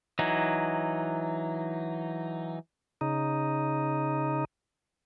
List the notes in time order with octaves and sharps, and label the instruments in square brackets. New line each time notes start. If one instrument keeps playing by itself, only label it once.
[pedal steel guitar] E3 F#3 D#4
[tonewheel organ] C#3 D#4